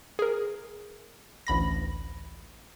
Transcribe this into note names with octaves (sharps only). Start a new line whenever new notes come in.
G#4 A#4
A1 D2 B5 A#6